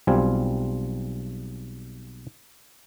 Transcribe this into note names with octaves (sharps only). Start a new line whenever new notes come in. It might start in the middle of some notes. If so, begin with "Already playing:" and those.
B1 G3 C4 F4 G#5